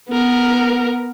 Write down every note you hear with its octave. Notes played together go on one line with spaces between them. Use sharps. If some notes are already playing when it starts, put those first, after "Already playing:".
B3 A#4